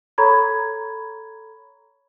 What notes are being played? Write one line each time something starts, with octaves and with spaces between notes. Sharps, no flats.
A4 C#5 A#5 B5 C#6 G#6